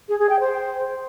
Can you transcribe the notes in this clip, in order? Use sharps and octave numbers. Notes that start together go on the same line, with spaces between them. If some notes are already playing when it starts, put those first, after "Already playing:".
G#4
G#4
G5
C5